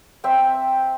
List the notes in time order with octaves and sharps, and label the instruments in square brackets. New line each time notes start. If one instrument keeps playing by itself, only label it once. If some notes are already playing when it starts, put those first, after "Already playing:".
[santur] C4 E5 G5